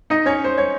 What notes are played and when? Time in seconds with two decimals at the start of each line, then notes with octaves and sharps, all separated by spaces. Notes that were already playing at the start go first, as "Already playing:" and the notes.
0.10 D#4 D#5
0.26 C#4 C#5
0.44 C5
0.58 C#5